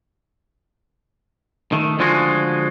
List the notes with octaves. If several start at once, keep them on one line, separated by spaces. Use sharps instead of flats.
D#3 A3
D3 F3 G#3 F4 F#4 G#4